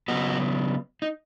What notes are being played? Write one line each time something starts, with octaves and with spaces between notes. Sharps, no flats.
C#3 F#3 B3 F#4
D#4